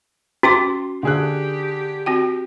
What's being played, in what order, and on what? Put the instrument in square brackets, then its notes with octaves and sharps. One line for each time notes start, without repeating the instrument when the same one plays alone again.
[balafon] C#4 G5 D6 [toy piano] F#4 [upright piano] C6
[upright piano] D3 G#4 F#6 [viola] G4
[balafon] C4 F#4 G5